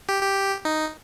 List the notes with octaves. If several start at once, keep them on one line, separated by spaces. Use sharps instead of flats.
G4
G4
D#4